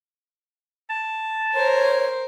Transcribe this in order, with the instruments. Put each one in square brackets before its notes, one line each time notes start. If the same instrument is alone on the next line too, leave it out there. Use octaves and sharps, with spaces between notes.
[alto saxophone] A5
[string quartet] A#4 C5 [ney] C#5